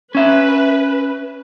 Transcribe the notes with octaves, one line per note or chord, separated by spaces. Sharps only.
C#4 B4 E5